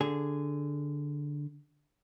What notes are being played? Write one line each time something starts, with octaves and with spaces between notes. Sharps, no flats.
D3 G#4